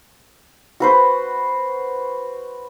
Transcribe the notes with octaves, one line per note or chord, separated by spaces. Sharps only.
F#4 B4 C5